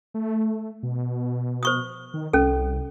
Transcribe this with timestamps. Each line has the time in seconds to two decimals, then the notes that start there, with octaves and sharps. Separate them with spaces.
0.14 A3
0.83 B2
1.63 C5 C#6 D#6
2.14 D#3
2.33 C2 C#4 A4